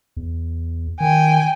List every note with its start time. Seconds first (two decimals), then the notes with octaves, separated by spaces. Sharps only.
0.17 E2
1.00 D#3 G5 G#5